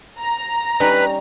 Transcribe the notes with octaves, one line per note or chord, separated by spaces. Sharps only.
A#5
G3 C#4 D#4 B4